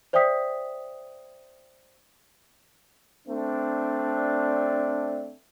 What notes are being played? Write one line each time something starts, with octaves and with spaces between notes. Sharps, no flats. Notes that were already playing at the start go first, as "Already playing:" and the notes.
C5 D5 E5 G5 D#6 B6
A3 C4 D4